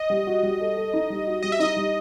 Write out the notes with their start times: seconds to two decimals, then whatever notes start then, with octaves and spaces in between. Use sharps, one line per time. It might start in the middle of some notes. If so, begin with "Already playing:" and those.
Already playing: D#5
0.10 G3
0.27 F#4
0.43 G3
0.61 A4
0.77 A4
0.93 D#4
1.10 G3
1.27 F#4
1.43 G3 D#5
1.52 E5
1.60 D#4 D#5
1.76 G3